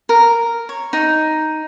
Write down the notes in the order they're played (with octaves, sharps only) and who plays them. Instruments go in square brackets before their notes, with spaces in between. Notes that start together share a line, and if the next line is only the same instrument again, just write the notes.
[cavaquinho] A#4
C#5
D#4